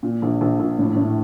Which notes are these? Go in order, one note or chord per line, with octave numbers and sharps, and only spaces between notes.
A#2
A#1
A#1
A#1
A2
A2